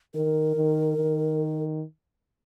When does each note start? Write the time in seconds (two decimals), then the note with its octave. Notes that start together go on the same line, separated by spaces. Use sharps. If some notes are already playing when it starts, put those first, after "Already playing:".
0.14 D#3 A#4
0.56 D#3
0.97 D#3